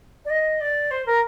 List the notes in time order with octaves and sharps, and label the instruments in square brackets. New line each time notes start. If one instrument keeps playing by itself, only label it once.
[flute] D5
D#5
D5
C5
A#4